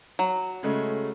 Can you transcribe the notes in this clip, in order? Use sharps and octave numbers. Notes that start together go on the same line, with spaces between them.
F#3
C#3 G#3 A3